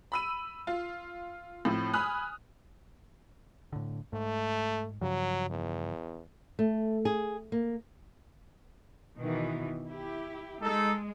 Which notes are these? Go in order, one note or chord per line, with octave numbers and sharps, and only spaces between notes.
B5 E6 D#7
F4
A2 F3 C4
G#5 B5 D#6 F6 F#6
A2 D3
G#2 A3
G2 C#3 F3 F#3
E2
A3
G#4
A#3
B2 D#3 E3
E4 G4
G#3 D#4 A4